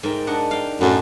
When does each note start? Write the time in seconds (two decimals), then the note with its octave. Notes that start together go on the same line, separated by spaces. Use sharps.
0.03 G#2 A#4 G5
0.27 D4 D#5 F#5
0.51 F5 G5
0.81 F#2 A2 F#3